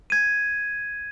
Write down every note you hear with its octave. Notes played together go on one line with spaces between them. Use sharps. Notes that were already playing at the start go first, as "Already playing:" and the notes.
G#6 D#7